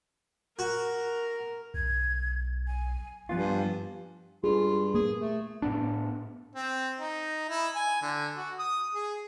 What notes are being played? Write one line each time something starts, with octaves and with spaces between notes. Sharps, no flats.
F#4 A#4
B1 G#6
G#5
G2 F3 B3 F4 G#5
G2 F4 G#4
A#3 G#4
A3
A2 B3 D4
C4
D#4
E4
G#5
D3
F#4
D#6
G#4